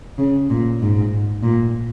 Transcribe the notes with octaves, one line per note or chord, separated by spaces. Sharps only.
C#3
A#2
G#2
A#2